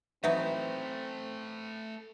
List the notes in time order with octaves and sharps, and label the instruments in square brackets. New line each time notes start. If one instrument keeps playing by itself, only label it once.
[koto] E3 F#3 D#4 [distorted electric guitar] A3 B4 [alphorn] C4 [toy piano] E5